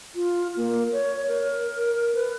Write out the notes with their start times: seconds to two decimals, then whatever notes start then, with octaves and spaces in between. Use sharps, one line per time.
0.15 F4
0.57 A#3
0.92 C#5
1.28 A#4
2.14 B4